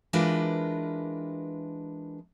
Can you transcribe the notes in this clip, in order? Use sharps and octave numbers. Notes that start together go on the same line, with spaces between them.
E3 G#3 D4 F4 A#4 B4